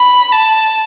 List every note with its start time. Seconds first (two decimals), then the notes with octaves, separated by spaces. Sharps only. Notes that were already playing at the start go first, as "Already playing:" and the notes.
Already playing: B5
0.32 A5